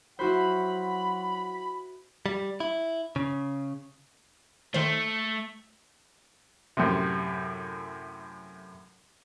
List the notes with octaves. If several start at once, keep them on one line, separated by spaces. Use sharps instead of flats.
F#3 E4 F#4 C5 F#5 B5
G3
E4
C#3
D#3 A3 C5
F#2 A2 C3